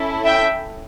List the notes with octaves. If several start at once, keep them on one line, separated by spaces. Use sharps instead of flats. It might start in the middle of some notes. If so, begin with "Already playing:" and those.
Already playing: C#4 E4 A4
E5 G5